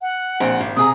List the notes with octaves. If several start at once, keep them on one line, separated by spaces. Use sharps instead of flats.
F#5
A#1 C4
G#1
C3 G#4 A#5 D#6